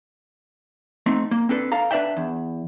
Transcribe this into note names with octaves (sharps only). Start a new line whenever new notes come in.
A3 C4 D#4
A#3
C4 D4 A4 B4
A4 F5 A#5
D4 B4 D5 E5 G5
E2